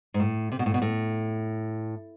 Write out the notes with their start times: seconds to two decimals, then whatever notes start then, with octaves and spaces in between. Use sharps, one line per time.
0.14 G#2
0.20 A2
0.52 C3
0.59 B2
0.66 A2
0.74 B2
0.82 A2